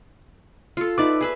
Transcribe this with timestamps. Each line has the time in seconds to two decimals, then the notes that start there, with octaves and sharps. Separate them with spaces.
0.77 F4 A4
0.98 D#4 B4 D5 E5 D6
1.21 G#4 B4 E5